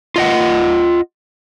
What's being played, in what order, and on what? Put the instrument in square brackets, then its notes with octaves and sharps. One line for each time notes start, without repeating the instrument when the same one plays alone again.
[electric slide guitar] F4 D#5 F#5